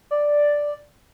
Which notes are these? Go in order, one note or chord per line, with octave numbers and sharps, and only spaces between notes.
D5